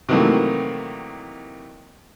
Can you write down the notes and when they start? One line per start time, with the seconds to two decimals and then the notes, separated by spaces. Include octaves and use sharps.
0.09 C3 D#3 E3 F#3 A3 A#3